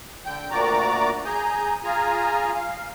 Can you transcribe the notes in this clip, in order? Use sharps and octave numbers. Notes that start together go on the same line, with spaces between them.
D3 G5 G6
D2 A#2 F#4 D5 A#5 D6
G#4 G#5 A#5 G6
F4 G#4 G#5 A#5
F5